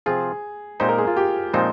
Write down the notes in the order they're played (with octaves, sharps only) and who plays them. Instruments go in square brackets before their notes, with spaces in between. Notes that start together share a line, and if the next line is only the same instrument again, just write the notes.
[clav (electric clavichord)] C3 F3 C4 F4 [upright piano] G#4
[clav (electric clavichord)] A#2 G#3 C4 D#4 G4 [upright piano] C5
[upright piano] A#4
G#4
F4
G4
[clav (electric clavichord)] A#2 F3 G#3 C4 D#4 [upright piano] C5